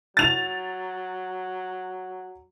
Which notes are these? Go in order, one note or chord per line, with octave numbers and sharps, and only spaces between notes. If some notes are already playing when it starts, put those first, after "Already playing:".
F#3 A6 F7